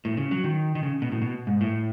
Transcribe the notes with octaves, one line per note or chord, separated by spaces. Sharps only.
A2
C#3
F#3
D#3
D#3
C#3
B2
A2
B2
G#2
A2